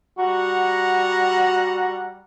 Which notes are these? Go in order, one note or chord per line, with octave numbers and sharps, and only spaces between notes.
G3 F#4 F#5 A#5